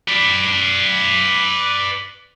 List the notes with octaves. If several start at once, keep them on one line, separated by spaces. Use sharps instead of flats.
B4 D5